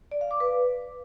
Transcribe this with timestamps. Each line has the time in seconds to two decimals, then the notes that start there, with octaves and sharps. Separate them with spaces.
0.11 D5
0.21 F5
0.31 D6
0.40 B4